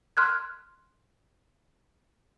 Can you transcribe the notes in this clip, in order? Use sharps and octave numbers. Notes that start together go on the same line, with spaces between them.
C6 F6 F#6 G#6